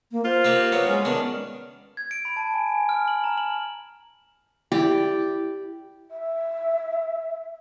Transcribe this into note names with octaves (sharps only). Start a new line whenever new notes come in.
A#3
F4 C5
A#3 C4 G4
F#3 B3 B4
G#3 C#4
D#3 B3 D4
G#6
D7
B5
A5
G#5
G#5
F6
F#7
A#5
F#7
E4 G4 D5
E5